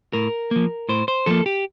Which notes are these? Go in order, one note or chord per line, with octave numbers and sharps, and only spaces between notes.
A2 A#4
F3 A#3
A2 C5
C5
F3 A#3 A4
G4